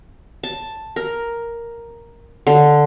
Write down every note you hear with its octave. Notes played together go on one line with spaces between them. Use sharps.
A5
A#4
D3